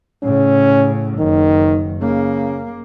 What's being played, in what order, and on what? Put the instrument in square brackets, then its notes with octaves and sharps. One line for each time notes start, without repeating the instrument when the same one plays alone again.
[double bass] A2 C#3 [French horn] C#4
[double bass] F#1 [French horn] D#3
[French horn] C#3 [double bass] A#3